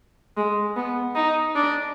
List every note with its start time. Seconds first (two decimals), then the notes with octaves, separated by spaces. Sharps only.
0.37 G#3
0.76 B3
1.15 D#4
1.55 D4